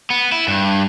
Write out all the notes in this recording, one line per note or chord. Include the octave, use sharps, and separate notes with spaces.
B3
E4
G2